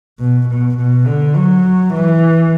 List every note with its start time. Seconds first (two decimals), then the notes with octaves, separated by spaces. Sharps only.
0.20 B2
0.49 B2
0.78 B2
1.06 D3
1.36 F#3
1.94 E3